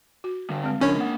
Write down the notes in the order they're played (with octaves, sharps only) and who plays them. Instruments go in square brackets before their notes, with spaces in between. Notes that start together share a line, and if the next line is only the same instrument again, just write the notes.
[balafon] F#4
[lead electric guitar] D3 G3
[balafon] G#3 C4
[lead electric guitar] C#3 F3 [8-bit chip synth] C#4 C#5 [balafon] D4 A#4 C#6
[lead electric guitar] A#3 F#5